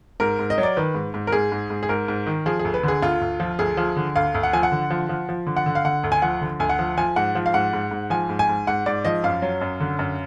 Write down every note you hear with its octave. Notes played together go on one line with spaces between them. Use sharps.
G#2 A#4
G#2
D#5
F#3
D5
D#3 B4
G#2
G#2
A#4
G#2 G#4
G#2
G#2
G#4
G#2 A#4
G#2
D#3
F3 G#4
G#4
D2
B4
D3 G#4
D2 F4
D2
F3
D2 G#4
F3
D3
D2 F5
D2
F#5
F3 G#5
F#5
D3
F3
F3
F3
D3
F#5
D3
F5
D3 F#5
D2
G#5
F3 F#5
D3
D2 G#5
F#5
F3
F3 G#5
G#2 F#5
F3
F5
G#2 F#5
G#2
G#2
F3 G#5
G#2
G#5
G#2
G#2 F#5
G#2 D5
F3 D#5
F#2 F5
F#3
F#2
D3
F#2